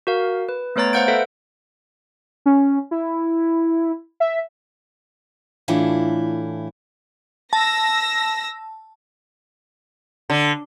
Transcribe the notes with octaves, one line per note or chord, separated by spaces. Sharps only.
F#4 A#4 F5
B4
A3 B3 B4 C#5 A#5 A6
C5 F5 F#5 G6 D7
A4 B4 E5 F5
C#4
E4
E5
A2 E3 A3 D4 E4 F4
A5 E6 A#6
D3